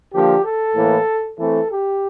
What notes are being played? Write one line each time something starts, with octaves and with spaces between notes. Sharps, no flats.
D3 F3 A#3 G4
A4
A2 E3 A#3
E3 A3 C4 A4
G4